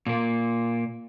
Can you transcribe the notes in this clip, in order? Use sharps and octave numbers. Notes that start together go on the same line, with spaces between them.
A#2 A#3